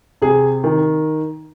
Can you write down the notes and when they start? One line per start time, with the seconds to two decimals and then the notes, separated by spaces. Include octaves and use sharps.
0.22 C3 G#4
0.64 D#3